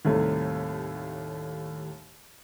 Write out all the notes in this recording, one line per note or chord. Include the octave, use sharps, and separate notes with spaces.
D#2 A2 C3 G3 A3